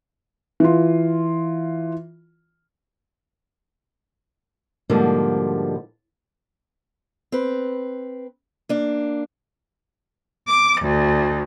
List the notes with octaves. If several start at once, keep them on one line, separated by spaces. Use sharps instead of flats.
E3 F4
G#2 B2 D3 F3 G3 A#3
C4 B4
A#3 D4
D6
D2